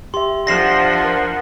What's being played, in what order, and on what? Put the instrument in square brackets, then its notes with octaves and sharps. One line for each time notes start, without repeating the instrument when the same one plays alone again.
[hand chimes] G4 E5 [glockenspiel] C6
[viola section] F3 [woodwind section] D4 F#5 [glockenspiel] A#6 C7 E7
[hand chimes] A#4